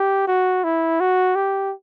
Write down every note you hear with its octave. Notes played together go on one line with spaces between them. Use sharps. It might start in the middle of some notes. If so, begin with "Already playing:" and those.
Already playing: G4
F#4
E4
F#4
G4